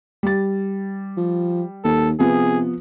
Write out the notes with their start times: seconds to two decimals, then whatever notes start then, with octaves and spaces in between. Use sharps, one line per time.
0.23 G3 A6
1.17 F3
1.84 D#2 A4
2.19 C3 F3 B3 G#4